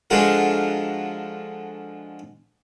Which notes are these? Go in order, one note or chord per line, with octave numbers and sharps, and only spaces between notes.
D3 F3 G#3 F4 F#4 A#4